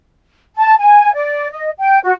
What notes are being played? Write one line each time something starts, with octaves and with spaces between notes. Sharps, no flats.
A5
G#5
D5
D#5
G5
F#4